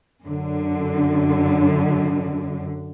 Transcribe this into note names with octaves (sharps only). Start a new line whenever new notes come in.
F#2 D3